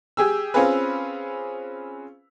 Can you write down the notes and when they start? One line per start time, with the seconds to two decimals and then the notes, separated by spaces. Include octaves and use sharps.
0.17 G4 G#4 E6
0.54 C4 C#4 F4 G#4 B4